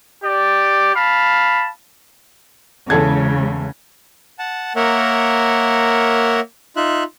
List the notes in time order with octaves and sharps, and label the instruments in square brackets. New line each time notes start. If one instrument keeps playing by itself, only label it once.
[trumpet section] G4 D5
F5 A5 B5
[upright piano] E2 A4 G#6 [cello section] C#3 G#3
[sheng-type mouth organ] F#5 A5
A#3 A#4 C#5 E5 F#5
D#4 F4 E5 F#6